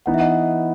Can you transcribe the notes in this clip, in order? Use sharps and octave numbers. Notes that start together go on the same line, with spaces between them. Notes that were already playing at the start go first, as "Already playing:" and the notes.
E3 B3 D#4 F#5
E5
D#5 F#5